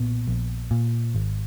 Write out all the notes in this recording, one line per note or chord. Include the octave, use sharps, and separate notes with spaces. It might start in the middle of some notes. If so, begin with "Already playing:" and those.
Already playing: B1 A#2 B3
A#1
A#2
G#1